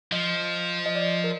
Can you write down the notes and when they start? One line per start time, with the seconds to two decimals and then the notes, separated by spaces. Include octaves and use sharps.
0.12 F3 D#5
0.86 D#5
0.95 D5
1.24 A#4